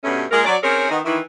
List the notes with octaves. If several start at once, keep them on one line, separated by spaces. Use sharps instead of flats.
G2 B2 G3 A3 C#4
A#2 G#3 F4 G#4 A#4
F#3 D5
C4 C#4 D#4 G#4 A#4 C#5
D#3 B3 D#5
D#3 E3 E4